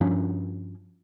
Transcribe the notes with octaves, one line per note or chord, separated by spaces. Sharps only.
G2 F3 C#4 D4